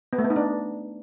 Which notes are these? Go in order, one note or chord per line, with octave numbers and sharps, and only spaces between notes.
B3
A3
B3
D#4
D4